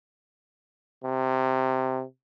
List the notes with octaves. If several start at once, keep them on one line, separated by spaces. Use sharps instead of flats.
C3